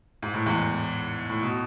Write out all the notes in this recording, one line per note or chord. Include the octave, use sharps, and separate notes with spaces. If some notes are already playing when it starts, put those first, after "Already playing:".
G#2
A2
E2 G#2
A2
B2